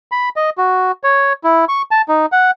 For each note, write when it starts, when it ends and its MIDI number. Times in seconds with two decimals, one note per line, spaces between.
0.12 0.29 83
0.36 0.50 75
0.58 0.92 66
1.04 1.33 73
1.44 1.65 64
1.69 1.82 85
1.91 2.02 81
2.08 2.26 63
2.32 2.51 78